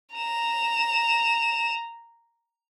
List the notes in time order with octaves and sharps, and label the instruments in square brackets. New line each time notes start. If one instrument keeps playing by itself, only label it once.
[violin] A#5 E7